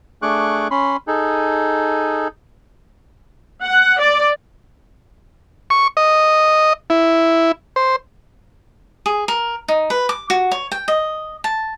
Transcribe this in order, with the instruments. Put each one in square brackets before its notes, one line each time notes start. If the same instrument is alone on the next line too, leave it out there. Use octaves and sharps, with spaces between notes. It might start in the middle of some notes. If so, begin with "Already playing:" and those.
[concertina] A3 D4 G#4 C#6 D6 F#6
C#4 B5 C6
D#4 G#4 A4
[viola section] F#5
D5
[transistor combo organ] C#6
D#5
E4
C5
[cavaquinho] G#4
A#4
D#4
B4
D6
F#4
C#5
G5
D#5
A5